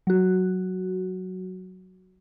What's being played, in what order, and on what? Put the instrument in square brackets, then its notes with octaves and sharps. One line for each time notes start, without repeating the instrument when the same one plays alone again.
[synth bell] F#3 F#4